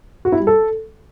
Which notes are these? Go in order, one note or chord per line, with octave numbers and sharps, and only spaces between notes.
F#4
E4
G3
A4